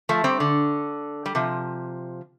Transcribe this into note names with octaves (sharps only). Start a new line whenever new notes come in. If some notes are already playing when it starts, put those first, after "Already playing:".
F3 A3
G3 C4
D3
G3
C3 F3